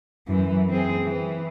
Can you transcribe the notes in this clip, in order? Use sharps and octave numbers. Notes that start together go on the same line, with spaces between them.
F#2 E3
C4 G#4
E3